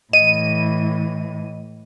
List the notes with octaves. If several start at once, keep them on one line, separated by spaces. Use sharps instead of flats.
A2 E3 D#5 D#7